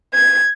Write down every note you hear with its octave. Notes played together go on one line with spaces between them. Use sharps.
G#6